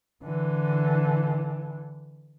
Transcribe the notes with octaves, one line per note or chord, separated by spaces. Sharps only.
D3 E3